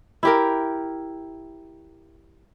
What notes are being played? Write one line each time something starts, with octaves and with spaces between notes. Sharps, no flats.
E4 G4 A#4